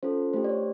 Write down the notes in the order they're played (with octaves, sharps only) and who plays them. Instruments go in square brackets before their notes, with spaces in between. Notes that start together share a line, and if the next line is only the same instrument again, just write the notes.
[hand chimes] C#4 F4 A4 C5
A3 D4 G4 C5
D5
C#5